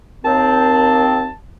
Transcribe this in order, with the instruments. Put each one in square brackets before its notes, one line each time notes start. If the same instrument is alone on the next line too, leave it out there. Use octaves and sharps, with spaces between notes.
[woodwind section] D#2 C4 [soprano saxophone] A5